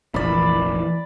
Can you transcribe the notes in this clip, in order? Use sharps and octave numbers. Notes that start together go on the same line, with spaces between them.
F1 A#1 E3 D5 B5